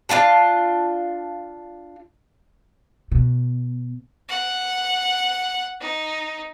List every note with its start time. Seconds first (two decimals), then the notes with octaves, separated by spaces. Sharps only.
0.09 D4 F4 F5 A5
3.12 B2
4.28 F#5
5.81 D#4